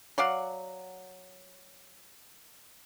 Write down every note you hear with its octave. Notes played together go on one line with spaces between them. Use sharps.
F#3 D5 F5 F#5